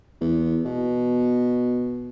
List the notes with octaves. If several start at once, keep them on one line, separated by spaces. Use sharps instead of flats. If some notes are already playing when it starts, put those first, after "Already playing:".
E2
B2